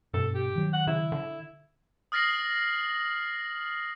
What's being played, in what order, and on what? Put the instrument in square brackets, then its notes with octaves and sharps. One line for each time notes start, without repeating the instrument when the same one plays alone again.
[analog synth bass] G2 [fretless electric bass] B2 [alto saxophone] A4
[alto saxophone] G4
[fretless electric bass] D#3 F#3
[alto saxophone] F#5
[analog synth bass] C#3 [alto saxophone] E4
[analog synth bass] D3
[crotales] D#6 F6 A6 A#6 C7 F#7